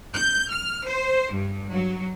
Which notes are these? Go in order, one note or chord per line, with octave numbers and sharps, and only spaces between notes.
G6
F6
C5
G2
F#3